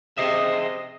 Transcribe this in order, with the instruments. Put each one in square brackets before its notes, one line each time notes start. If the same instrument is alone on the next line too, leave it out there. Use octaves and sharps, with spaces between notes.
[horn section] C3 D#5 [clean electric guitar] G#4 C5 E5